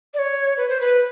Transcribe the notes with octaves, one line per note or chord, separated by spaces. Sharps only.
D5
C#5
B4
C5
B4